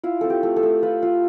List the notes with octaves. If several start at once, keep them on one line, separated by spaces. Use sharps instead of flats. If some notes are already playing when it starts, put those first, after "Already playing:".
E4 F4
C4 A4
G4
A3
A4
A3
F4 B4
F4